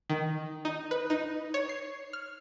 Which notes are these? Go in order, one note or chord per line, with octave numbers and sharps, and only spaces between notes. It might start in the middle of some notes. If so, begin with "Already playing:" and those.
D#3
D#4
B4
D#4
C#5
C7
F6